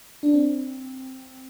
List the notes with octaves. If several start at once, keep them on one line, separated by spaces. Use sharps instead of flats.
D4
C4